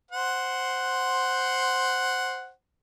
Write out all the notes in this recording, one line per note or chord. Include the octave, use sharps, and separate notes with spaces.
C5 F#5